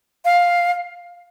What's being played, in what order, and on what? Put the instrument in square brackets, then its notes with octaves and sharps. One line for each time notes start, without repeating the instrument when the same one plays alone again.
[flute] F5